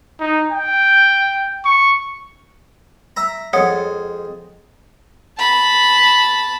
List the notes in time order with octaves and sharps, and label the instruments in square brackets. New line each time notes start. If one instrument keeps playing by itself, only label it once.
[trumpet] D#4
G5
C#6
[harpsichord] E5 A#5
[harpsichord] F2 G#3 [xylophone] C#5 F#5 D#6
[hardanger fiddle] A5 B5